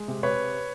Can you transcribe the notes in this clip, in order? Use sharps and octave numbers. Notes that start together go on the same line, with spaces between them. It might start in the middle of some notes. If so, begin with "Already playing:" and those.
Already playing: G#3
C3
C3 B4 C#5